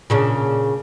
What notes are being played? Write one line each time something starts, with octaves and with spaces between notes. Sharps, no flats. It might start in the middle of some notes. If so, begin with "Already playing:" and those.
A#2 C#3 D4